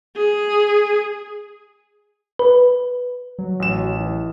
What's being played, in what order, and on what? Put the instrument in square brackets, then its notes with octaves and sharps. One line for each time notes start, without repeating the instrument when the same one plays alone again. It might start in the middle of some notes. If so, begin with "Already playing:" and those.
[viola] G#4
[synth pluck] B4
[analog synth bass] F#3
[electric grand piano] A1 E7
[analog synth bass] E3